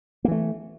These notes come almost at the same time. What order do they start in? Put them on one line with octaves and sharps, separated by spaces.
A#3 E3 A3